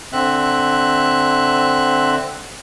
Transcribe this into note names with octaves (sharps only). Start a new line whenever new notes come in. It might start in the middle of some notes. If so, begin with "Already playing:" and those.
D3 C4 E5 F#6